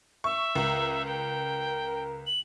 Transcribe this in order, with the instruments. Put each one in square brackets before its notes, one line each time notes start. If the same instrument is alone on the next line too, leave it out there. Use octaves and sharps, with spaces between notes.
[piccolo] E5 [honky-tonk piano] C#6
[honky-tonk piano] C#2 [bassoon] A#4
[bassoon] A#4 [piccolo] G5
[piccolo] F#7